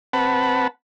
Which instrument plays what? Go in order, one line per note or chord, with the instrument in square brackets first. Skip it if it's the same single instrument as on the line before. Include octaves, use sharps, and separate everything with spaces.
[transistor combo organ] C4 B4 F#5 A5 B5